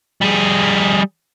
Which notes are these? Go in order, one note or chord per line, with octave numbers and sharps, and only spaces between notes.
G3 G#4